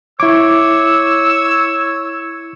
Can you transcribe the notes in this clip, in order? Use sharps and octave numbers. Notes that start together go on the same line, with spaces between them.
E4 C#5 D6 E6